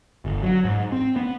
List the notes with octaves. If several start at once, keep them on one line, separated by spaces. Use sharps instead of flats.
G1
F#3
G#2
C4
B3